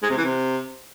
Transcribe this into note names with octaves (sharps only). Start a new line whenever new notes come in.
G#3
C3
E3
C3